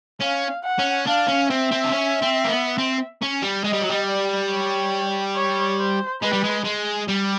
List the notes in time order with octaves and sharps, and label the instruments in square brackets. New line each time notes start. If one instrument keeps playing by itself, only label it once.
[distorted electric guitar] C#4 [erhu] F5
[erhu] F#5
[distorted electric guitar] C#4
[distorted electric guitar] D4 [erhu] F5
[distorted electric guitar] C#4
[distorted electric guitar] C4 [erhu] E5
[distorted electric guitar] C4
D4
C#4
C4
A#3
B3
C4
C#4
G3
[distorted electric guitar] G#3 [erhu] D#5
[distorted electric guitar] G3
F#3
G3
[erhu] D5
C#5
C#5
C5
[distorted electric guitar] G#3 [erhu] B4
[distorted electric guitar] G3
G#3
G#3
G3